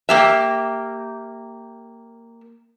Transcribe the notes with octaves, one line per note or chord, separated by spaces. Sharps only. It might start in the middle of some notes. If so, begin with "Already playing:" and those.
A#3 G4 E5